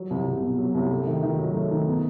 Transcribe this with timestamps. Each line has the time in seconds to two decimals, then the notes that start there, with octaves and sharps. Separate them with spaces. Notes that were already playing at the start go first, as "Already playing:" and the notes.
Already playing: F#3
0.10 C2
0.27 C2
0.42 B2
0.58 F#3
0.74 C2
0.90 A3
1.06 D#3
1.23 D#3
1.38 F#3
1.54 A3
1.71 D#3
1.87 B3